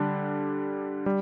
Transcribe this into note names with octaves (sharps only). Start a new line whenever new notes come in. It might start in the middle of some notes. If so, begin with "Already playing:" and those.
Already playing: D3 G3 D4
G3